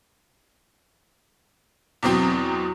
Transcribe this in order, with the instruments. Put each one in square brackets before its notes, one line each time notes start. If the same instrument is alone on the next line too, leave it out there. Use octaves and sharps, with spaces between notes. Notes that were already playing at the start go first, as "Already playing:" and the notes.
[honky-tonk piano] E2 B2 F#3 C4